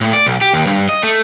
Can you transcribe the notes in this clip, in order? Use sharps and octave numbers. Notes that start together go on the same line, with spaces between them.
A2
D5
B1
G4
D#2
G2
D#5
A3